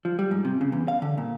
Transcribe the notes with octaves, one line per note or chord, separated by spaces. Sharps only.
F3
G3
G#2
C3
C#3
E2
F5
D3
A#2